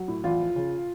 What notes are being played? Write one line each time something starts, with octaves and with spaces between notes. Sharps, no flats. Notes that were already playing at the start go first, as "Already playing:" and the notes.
Already playing: F#3
A2
E2 F4
F3
C#3